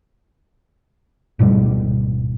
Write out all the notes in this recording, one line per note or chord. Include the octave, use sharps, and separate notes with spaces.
D1 G#2 B2 G3